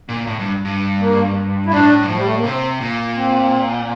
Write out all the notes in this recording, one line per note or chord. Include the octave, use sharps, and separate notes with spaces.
A#2
A2
G2
G2
A#3
E4
A2 D4
G2
A2 F3
G3
A3
A#3
C3 C4
A#2
C4